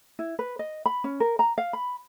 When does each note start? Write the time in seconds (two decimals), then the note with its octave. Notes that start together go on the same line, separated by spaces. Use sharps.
0.19 E4
0.39 B4
0.59 D#5
0.86 B5
1.04 C#4
1.20 A#4
1.39 A#5
1.58 F5
1.73 B5